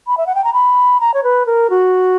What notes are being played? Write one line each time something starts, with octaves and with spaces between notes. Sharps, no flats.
B5
E5
F#5
G5
A#5
B5
A#5
C#5
B4
A#4
F#4